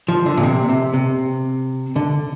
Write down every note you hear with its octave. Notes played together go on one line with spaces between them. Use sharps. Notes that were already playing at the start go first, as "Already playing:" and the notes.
F3
D3
A#2
C3
C3
C3
D3